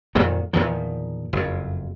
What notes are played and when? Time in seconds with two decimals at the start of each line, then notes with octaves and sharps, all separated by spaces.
0.15 F2 A#2 D#3 F#3
0.53 E2 A#2 D#3 F3
1.33 F#1 F2